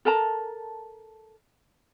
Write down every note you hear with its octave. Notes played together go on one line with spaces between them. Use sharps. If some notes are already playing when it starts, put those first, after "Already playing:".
A4 A#4 A5 A#5